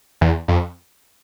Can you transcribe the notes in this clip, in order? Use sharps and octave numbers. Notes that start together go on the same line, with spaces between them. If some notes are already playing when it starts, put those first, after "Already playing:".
E2
F2